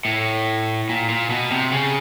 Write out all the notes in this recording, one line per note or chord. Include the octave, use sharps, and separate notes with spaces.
A2
A#2
A#2
B2
C3
C#3